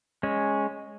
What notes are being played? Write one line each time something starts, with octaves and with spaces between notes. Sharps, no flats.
G#3 C#4